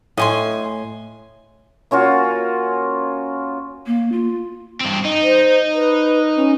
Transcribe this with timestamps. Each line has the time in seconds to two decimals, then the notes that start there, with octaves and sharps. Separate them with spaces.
0.17 A2 D#5 G#5 C6
1.91 A#3 C#4 F4 F#4
3.86 A#3
4.12 F4
4.81 G2 C4
5.05 D#4
5.22 C5
5.74 B4
6.36 C#4